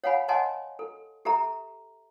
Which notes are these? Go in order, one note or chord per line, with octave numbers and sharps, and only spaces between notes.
C#5 F5 F#5 G#5 B5
C#5 D#5 F#5 G#5 A5 C6
A4
G4 A4 E5 A#5